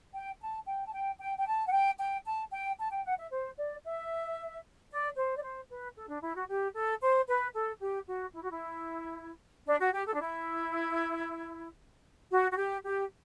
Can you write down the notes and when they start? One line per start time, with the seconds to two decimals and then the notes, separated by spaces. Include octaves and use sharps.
0.13 G5
0.40 A5
0.66 G5
0.86 A5
0.93 G5
1.19 G5
1.38 G5
1.47 A5
1.67 F#5
1.72 G5
1.99 G5
2.25 A5
2.52 G5
2.79 A5
2.92 G5
3.04 F#5
3.17 E5
3.31 C5
3.57 D5
3.84 E5
4.91 D5
5.16 C5
5.36 D5
5.42 C5
5.70 B4
5.96 A4
6.08 D4
6.23 E4
6.35 F#4
6.49 G4
6.75 A4
7.01 C5
7.28 B4
7.54 A4
7.81 G4
8.07 F#4
8.34 E4
8.42 F#4
8.50 E4
9.66 D4
9.80 F#4
9.93 G4
10.07 A4
10.13 D4
10.20 E4
12.32 F#4
12.51 F#4
12.58 G4
12.84 G4